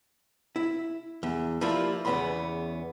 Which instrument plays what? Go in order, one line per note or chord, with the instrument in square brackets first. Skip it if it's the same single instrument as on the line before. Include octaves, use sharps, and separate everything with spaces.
[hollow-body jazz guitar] E4
E2
F3 G3 A#3 E4 F4
E2 C#3 G#3 B3 B5 C6